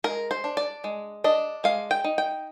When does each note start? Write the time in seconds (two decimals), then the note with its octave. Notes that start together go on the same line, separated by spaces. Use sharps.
0.04 G#3 A#4
0.31 C5
0.44 D4
0.57 D5
0.84 G#3
1.24 D4 D#5
1.64 G#3 F5
1.91 G5
2.04 D#4
2.18 G5